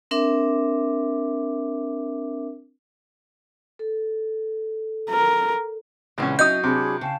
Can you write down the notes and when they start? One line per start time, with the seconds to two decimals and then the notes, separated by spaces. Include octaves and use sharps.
0.11 C4 D4 A#4 E5 D6
3.79 A4
5.10 A#4
6.18 A#1 C#3 E3 G#3 C#4
6.39 F#3 C#4 D#4 D#5 E5 D#6 G6
6.63 C3 D4 G#4 B5
7.01 C#3 F5 G5 A5